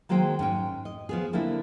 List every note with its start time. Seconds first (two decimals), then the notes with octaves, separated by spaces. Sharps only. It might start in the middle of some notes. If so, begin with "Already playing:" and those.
0.09 D#3 F#3 G#3 A#3 C5 G5
0.39 G#2 C#4 G5
0.85 D#5
1.09 F3 B3 G#4
1.33 D3 A#3 C4 D4 E4